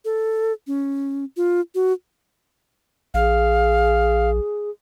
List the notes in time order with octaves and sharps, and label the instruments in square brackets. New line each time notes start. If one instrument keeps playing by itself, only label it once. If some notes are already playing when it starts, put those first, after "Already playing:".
[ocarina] A4
C#4
F4
F#4
[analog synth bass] A#1 [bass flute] G#4 [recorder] F5